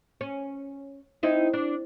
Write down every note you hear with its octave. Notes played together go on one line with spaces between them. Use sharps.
C#4
C4 D#4 E4
D4